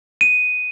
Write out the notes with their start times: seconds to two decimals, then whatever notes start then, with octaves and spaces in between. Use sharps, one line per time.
0.21 D#7